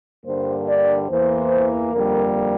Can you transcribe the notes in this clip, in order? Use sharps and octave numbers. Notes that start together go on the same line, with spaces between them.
G2 D3 G3 A#3 C5
D5
E2 E3 A#3 C5
F2 D3 G3 A#3 A#4